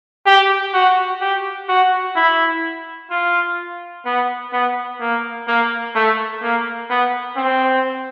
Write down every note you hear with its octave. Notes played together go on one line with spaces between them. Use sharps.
G4
F#4
G4
F#4
E4
F4
B3
B3
A#3
A#3
A3
A#3
B3
C4